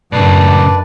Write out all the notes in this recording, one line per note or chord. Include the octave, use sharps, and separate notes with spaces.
F#2 A2 C#3 D4 B4 D5